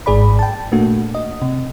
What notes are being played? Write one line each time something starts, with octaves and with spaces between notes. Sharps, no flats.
G#1 G#2 G#4 D5 B5
G5 A5
A#2 A3 A#3 D4 F#4
D#5
C3